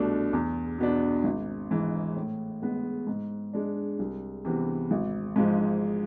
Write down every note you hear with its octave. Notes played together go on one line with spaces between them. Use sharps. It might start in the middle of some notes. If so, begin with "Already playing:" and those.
Already playing: C2 B2 A3 D4
E2
B2 B3 D4
G#1
G#2 E3
A2
G#3 B3
G#2
G#3 D4
C2
C3 E3 B3
G#1
G#2 F3 G#3